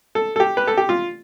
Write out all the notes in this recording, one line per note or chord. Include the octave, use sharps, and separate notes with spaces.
A4
A4
G4
B4
A4
G4
F4